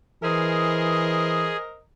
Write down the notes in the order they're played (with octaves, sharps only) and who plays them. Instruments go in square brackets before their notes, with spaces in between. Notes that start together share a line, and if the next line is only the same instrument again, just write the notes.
[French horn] E3 [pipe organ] G#4 [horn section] A#4 C5 D#5